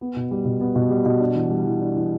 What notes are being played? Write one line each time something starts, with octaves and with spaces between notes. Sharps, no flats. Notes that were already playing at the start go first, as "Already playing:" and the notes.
B3
B2
G3
B2
B3
B2
G3
B2
D4
E3
G3
E3
D4
E3